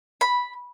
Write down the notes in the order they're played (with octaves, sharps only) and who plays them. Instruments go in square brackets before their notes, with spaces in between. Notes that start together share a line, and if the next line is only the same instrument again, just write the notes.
[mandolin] B5